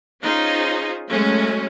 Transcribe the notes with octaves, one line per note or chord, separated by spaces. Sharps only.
C#4 D#4 F4 G#4 C5
F#3 G#3 A3 C#4